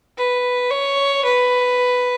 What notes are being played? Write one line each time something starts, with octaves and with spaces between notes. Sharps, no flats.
B4
C#5
B4